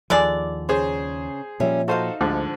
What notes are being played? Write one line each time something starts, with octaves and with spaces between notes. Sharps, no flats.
D#2 D3 F3 G#3 D5
C#3 G#4 C5
A#2 F3 G3 C#4 E5
D#4 F#4 A4 C5 D#5 F5
D2 G#2 D3 F3